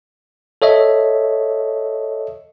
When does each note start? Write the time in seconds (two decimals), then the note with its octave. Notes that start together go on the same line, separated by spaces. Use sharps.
0.62 A4 C#5 D#5 E5